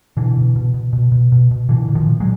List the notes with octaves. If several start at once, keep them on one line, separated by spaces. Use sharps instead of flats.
B2 D3 E3
B2
B2
B2
B2
B2
B2
B2
A#2 D3 E3
A#2
D#3 F3
A#2
F#3 G#3